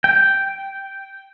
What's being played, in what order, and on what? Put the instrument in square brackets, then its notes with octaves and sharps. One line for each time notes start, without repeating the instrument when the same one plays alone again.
[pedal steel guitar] G5